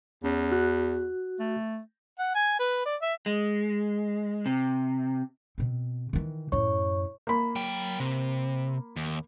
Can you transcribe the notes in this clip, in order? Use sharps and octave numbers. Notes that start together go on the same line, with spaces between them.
E2 C#4
F#4 F#6
A3
F#5
G#5
B4
D5
E5
G#3
C3
B2 C4
D#3 E3
F#2 A2 C#5 C#6
A#3 B5
F#3 G5
C3
D#2